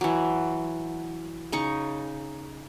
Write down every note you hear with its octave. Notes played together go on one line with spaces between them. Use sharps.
E3 F#3
C#3 D#4 C#6